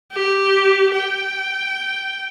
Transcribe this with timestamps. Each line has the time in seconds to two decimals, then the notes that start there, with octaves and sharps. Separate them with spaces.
0.12 G4
0.95 G5